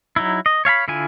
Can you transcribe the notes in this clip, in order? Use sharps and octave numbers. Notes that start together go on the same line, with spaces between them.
F#3 D#4 E4
D#5
C#5 F5 G#5 B5
D3 E4 F4 G#5